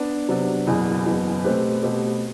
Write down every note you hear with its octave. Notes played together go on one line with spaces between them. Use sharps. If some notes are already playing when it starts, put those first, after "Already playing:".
Already playing: B3 D4
C3 F#3 B3 D4
F#1 E2 B2
F#1 E2 B2
B2 A3 C4 G4 B4
B2 A3 C4 G4 B4